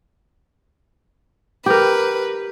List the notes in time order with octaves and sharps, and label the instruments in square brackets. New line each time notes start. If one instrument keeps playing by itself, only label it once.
[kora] G4 A#4 [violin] B4